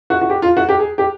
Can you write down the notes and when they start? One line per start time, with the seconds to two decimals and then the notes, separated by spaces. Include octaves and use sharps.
0.10 F#4
0.21 F#4
0.30 G4
0.42 F4
0.57 F#4
0.69 G4
0.79 G#4
0.98 G4